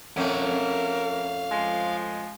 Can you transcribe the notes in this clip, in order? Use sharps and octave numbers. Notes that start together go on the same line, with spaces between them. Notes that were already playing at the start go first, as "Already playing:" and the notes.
F2 A3 C#4 A#4 F5 F#5
F3 G#3